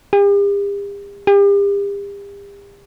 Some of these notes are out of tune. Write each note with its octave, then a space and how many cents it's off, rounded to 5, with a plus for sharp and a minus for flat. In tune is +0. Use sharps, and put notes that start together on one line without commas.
G4 +45
G4 +40